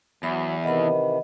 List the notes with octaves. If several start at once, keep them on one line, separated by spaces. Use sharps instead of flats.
E2 F#3 E5 B5
C3 D#3 E3 D#5 F#5 B5